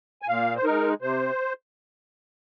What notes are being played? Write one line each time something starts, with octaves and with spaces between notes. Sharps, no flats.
G#5
A#2 F5
C5
G#3 D#4 A#4
C3 C5